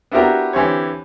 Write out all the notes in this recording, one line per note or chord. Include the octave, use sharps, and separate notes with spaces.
B3 D4 E4 F#4 G4 A#4
D3 E3 C4 G4 C5 C#5